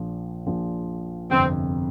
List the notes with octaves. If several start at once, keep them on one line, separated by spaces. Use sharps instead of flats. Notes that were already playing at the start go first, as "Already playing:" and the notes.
Already playing: A#1 A#2 F3
A#1 A#2 F3
G1 F2 C3 C4